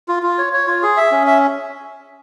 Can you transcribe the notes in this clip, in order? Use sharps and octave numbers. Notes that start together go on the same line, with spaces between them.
F4
F4
C#5
C#5
F4
G#4
E5
C#4
E5